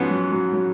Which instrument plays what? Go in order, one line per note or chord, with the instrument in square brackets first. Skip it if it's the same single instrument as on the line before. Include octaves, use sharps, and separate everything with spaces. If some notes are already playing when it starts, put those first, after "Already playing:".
Already playing: [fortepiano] G#2 F3 B3 [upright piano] C#4 F#4
[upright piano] F#3
F#3
F#3